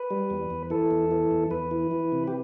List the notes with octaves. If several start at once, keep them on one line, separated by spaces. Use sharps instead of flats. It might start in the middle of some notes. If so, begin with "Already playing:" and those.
Already playing: B4
G3
E2
E2
E3 A4
E2
E3
E2
E2 B4
E3
E3
C3
G4